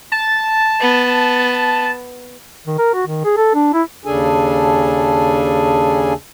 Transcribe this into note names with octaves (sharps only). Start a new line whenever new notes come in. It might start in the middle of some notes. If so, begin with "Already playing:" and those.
A5
B3
D#3
A#4
F#4
D#3
G#4
A4
D4
E4
D#2 C#3 D4 G#4 A4 G#5